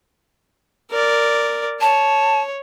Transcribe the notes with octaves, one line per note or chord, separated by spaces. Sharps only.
A#4 D5
C#5 A5